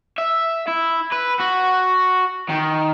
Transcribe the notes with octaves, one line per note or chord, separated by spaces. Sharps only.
E5
E4
B4
F#4
D#3